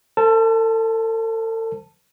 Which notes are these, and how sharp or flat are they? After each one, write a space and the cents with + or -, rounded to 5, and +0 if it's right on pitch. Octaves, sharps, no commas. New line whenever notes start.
A4 +40 C5 -10 A5 +0